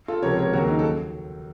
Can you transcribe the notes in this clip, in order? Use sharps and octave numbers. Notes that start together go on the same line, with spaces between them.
F4 A4
C#2 C3 F3 A#4 C#5
A#4 C#5
D#2 C#3 F#3 F#4 A#4
D#4
A4